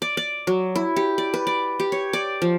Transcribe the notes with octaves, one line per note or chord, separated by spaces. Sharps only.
D5
D5
F#3
E4
G4
D5
B4
D5
G4
C#5
D5
F3